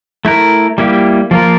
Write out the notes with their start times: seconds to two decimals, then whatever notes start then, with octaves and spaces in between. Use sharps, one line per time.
0.25 A3 E4 A#4
0.78 G3 A#3 E4 G4
1.31 F3 A#3 F4 A#4